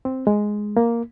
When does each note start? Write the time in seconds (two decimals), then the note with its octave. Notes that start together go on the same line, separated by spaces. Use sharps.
0.05 C4
0.27 G#3
0.77 A#3